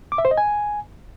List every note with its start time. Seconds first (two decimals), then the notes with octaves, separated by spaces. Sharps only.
0.12 D6
0.18 E5
0.25 C5
0.31 D#5
0.38 G#5